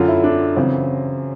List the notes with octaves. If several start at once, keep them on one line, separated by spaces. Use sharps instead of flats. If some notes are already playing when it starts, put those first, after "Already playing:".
Already playing: F#2 D3 F4
E4
D4
F#2 C#3 E3 C4